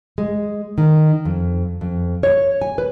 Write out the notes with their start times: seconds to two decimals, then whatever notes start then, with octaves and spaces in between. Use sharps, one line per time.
0.18 G#3
0.78 D#3
1.25 F2
1.81 F2
2.23 C#5
2.61 G#5
2.78 B4